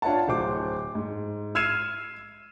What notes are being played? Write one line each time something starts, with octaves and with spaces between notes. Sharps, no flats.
D4 F4 C#5 E5 F#5 A5
D1 C5 D6
G#2
E6 F6 G#6 C7 D#7 E7